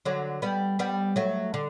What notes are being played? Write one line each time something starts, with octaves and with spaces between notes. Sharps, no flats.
D3 F#3
G3 B3
G3 B3
F#3 A3
D3